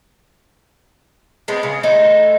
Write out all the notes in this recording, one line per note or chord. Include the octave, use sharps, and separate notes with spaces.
G#3 B3 C4
C#3
E3 A3 D#4 C5